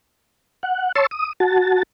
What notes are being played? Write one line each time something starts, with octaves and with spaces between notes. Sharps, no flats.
F#5
C#5 A5 C6 C#6 E6
D#6
F#4 A5